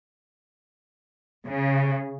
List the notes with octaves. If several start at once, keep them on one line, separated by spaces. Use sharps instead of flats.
C#3